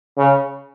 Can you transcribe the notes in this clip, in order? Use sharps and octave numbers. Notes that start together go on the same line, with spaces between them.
C#3